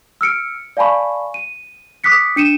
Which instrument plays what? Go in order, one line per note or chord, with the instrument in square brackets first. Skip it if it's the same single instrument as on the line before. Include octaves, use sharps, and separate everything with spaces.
[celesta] E6 F6 C#7 D7
D5 F5 G#5 A5 B5 C#6
D#7
D6 D#6 F#6 B6 C#7
D4 C#7 D#7 E7